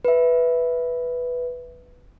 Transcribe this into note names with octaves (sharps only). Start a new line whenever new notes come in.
B4 E5